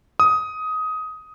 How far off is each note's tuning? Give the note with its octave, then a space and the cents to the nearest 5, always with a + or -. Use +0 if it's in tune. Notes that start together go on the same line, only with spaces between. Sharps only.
D#6 +15